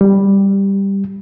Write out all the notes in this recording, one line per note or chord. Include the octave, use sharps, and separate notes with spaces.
G3